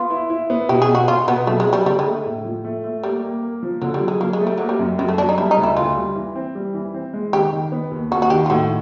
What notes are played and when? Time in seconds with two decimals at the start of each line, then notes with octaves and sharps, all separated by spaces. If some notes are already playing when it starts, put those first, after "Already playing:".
Already playing: B3 F4
0.10 E4
0.30 E4
0.50 B3
0.69 B2 G4
0.82 G#4
0.89 B2
0.95 F#4
1.08 B2 F4
1.27 B2 B3
1.47 F#3 A3
1.60 G#3
1.67 F#3
1.73 G3
1.86 D3 G3
1.99 G#3
2.06 A3
2.26 A2
2.45 F3
2.64 A3
2.84 A3
3.03 G3 A#3
3.23 A#3
3.43 A#3
3.63 F3
3.81 D3 F#3
3.94 G3
4.01 F#3
4.08 G#3
4.21 F#3 A#3
4.33 G#3
4.41 A3
4.47 G3
4.58 F#3 A#3
4.69 G3
4.79 F#2
4.99 F#2 G3
5.08 A3
5.18 F#3 D4
5.29 D#4
5.38 G3 E4
5.51 D#4
5.57 D2
5.63 E4
5.77 D2 F4
5.97 G3
6.16 E3
6.35 C4
6.55 G3
6.74 E3
6.94 C4
7.13 G#3
7.33 D#3 G4
7.53 D#3
7.72 B3
7.91 D#2
8.11 D#2 F#4
8.22 F#4
8.30 D#3 G4
8.46 F4
8.50 A2 F#4